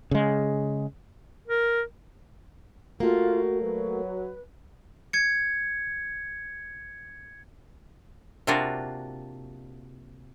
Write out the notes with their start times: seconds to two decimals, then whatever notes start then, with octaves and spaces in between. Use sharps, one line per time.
0.11 C#3 G#3
1.48 A#4
3.00 A3 A#3 F4 F#4
3.62 F#3 B4
5.13 G#6 C#7
8.47 C3 A#3 D4 F4 F#4